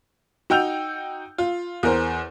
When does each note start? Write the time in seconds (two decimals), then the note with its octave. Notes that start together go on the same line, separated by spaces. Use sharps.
0.50 D#4 F#4 G5 E6 G6 F7
1.38 F4
1.83 E2 A#4 C5